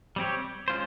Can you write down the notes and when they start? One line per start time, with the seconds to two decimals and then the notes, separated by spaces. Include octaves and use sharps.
0.16 G3 C4 G4 C#5
0.68 G#3 C#4 F4 C5